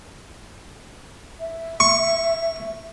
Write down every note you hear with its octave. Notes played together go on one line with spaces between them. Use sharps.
E5
C#6